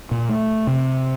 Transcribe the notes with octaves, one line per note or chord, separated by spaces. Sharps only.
A#2
A3
C3